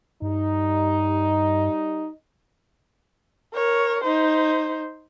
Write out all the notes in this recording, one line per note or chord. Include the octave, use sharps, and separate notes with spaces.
G2 G3 D#4
A#4 C#5
D#4 C5